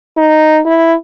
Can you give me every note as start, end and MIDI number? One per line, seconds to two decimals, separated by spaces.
0.17 0.60 63
0.66 0.94 64